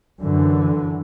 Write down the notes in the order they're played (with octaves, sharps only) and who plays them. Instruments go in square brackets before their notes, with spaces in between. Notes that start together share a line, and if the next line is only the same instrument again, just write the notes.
[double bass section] F#2 D3 E3